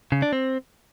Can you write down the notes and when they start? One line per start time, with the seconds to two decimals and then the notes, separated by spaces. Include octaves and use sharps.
0.12 C#3
0.22 D4
0.33 C4